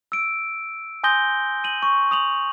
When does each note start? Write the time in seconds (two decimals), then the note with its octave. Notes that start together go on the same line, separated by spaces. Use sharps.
0.12 E6 D7
1.04 G#5 C6 D#6 G6 A#6 G7
1.64 D#7 F#7
1.83 C#6
2.11 D#6 F7 F#7